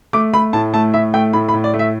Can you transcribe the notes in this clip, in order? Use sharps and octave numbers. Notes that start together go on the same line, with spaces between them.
A3 D6
A3 B5
A2 A5
A3 A5
A2 E5
A3 G5
A2 B5
B5
A2
D5
A3
E5